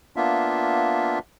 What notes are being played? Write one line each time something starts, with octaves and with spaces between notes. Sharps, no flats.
A#3 B3 D4 F4 E5